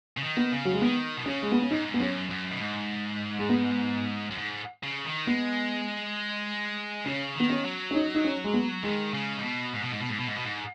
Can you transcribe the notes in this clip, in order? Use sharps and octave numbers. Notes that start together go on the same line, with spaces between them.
C#3
D#3
B3
C#3
F#3
G#3
D#3 B3
B2
C#3 C#4
G#3
B3
C#4
G#2 D#4
B3
F#2 C#4
F#2
B2
G#2
G#3
B3
F#2
G#2
C#3
D#3
G#3 B3
C#3 C#4
D#3 B3
C#4
F#3
C#4
D#4
D#4
C#4
G#3
B3
D#3 G#3
C#3
G#2
B2
G#2
B2
G#2
B2
G#2
B2
G#2
B2
G#2